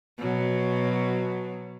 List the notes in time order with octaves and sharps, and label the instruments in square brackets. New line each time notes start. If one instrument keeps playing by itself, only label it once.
[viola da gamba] B2 F#3